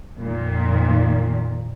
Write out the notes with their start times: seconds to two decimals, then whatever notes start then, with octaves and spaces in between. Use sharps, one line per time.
0.20 F2 A#2 D#3